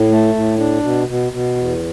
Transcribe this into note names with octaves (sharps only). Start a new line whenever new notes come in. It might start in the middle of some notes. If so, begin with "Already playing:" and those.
Already playing: A2
A3
A2
D4
B2
B2
B2
E2